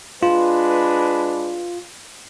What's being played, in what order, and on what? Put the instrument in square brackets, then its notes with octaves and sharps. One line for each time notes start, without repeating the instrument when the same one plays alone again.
[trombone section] G#3 D4 B4 [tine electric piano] F4